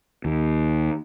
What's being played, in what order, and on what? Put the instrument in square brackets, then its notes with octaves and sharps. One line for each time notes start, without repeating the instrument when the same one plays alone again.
[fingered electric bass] D#2